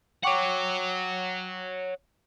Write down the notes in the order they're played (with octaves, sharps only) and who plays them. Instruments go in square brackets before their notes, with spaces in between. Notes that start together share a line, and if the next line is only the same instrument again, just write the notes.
[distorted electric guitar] C#5 F#5 [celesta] G5 C#6 D6